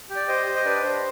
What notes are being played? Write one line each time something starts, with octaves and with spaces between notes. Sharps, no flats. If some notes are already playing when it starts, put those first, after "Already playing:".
G4
D5
G4 C5 D#5
G4
D#5
D4 B4 D5
D4 C5